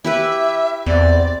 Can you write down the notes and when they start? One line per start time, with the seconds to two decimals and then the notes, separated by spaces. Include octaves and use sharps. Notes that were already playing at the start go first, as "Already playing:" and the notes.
0.04 E4 G4 B4 E5
0.86 E2 C4 D5